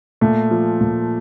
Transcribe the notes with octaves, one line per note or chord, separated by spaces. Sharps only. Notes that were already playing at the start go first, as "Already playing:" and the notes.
A#2 A3
F3
A#2